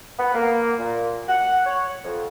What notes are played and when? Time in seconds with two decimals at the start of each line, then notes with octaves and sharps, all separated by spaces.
0.19 B3
0.34 A#3
0.79 A#2
1.29 F#5
1.66 C#5
2.04 F2